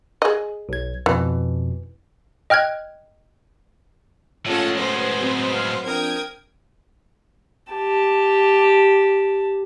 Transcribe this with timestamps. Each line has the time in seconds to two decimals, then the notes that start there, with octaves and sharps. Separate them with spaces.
0.22 G#4 D#5
0.69 B1 G#6
1.06 F2 B2 E3
2.50 D#5 G5 F6 F#6 G#6
4.46 A2 G#3 A3 C#4 F4 A4 C#5 F#5
4.77 F#3 B3 B4 C5
5.20 F#3 C4
5.55 F5
5.85 F3 C4 D4 A#4 G5 D#6 G#6
7.72 G4 A5